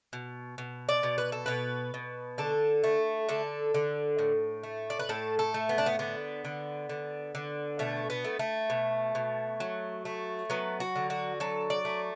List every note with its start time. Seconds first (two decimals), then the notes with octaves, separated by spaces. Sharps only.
0.13 B2
0.58 B2
0.89 D5
1.03 B2
1.18 B4
1.32 A4
1.46 B2 B4
1.94 B2
2.38 D3 A4
2.84 A3
3.29 D3 A4
3.74 D3
4.19 A2
4.63 A3
4.90 D5
4.99 B4
5.09 A2 A4
5.39 A4
5.54 A3
5.69 B3
5.78 D4
5.86 B3
5.99 D3 B3
6.45 D3
6.89 D3
7.35 D3
7.79 B2 A3
8.10 B3
8.25 A3
8.39 A3
8.70 B2
9.15 B2
9.60 F#3
10.05 A3
10.50 F#3 B3
10.80 F#4
10.96 D3
11.10 F#4
11.40 F#3 A4
11.70 D5
11.85 A3